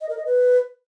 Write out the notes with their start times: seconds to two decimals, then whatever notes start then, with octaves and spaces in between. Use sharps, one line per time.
0.01 D#5
0.09 A#4
0.17 D#5
0.25 B4